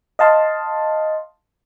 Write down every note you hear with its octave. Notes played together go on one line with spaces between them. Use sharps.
D#5 F5 A5 C6